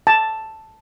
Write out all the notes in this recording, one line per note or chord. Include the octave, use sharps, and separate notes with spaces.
A5